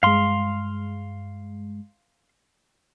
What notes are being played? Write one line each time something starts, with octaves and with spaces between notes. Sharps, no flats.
G2 G#3 F5 C6